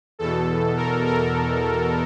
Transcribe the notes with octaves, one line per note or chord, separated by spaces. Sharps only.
E2 B2 A4
A#4
A#4